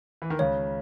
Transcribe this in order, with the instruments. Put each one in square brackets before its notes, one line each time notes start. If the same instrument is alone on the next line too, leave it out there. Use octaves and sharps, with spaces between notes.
[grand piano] E3
D#3
[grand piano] C#2 C#3 [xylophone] C#5